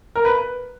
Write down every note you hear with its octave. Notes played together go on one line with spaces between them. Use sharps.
A#4
B4